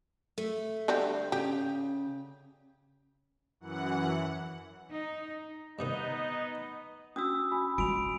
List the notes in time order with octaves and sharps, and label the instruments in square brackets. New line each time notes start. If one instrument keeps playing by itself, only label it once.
[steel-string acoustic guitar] A3
[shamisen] D3 G3 C4
[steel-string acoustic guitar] C#3 [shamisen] G4
[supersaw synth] F#2 E3 F#5
[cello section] D#4
[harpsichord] G2 C3 D#3 [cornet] B3 [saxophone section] D#4 [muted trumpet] D#5
[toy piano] C#4 D4 F#4 [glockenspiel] D#6 E6
[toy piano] F#4 [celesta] G#5 B5
[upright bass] G#3 [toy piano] F#4 [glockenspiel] D7 F7